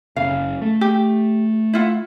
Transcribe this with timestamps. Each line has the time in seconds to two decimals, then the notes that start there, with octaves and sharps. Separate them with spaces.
0.16 F#1 C#3 C#4 F5
0.61 A3
0.81 G4
1.74 E4 F4 F#5